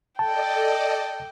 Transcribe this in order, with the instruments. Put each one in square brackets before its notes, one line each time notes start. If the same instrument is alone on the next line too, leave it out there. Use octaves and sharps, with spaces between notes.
[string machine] A4 D5 D#5 [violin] G5 [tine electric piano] A5